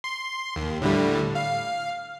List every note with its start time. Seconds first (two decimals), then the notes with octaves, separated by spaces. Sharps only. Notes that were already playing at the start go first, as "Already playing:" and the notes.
0.04 C6
0.56 D#2
0.82 A2 D3 G3
1.35 F5